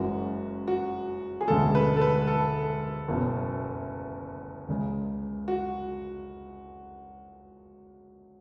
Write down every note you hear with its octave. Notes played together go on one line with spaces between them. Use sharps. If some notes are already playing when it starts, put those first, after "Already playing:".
Already playing: F#1 F#2 E3 G#3 F#4
F#4
G#4
E1 D2 C#3 G#3 A4
B4
A4
B4
A4
F#1 E2 B2 F#3
C#2 C#3 G#3
F#4